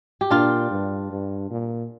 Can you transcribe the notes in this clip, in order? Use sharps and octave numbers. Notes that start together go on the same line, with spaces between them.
G4
A#2 D4 F4
G2
G2
A#2